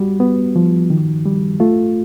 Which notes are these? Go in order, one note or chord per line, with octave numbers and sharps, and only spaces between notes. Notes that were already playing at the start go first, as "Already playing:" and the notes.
Already playing: G3 F#4
B3
F3
D#3
G3
A3 F4